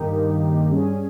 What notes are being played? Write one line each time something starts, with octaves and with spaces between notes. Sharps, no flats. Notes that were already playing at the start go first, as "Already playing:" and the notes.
Already playing: G2 D#3 A#3 D#4 G4
G2 G3 C#4 G#4